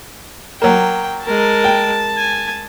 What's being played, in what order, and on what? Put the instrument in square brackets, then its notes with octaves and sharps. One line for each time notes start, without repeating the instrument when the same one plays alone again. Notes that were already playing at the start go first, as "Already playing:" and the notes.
[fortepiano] F#3 A#3 [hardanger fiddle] G5
[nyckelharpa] G#3 A#4 [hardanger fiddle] A5
[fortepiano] G5
[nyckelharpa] G#5